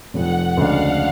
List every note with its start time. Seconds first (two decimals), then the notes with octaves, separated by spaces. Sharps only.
0.14 F1 F2 F3 F#5
0.57 D2 C#3 G#3 D4 F5